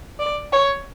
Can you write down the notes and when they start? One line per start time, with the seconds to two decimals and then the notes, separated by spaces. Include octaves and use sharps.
0.19 D5
0.52 C#5